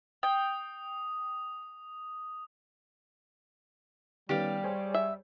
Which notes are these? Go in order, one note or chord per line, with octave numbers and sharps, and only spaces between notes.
G5 D#6
D#3 G3 B3 C#4 G4 D5 F5
G#4 C5 C#5
E5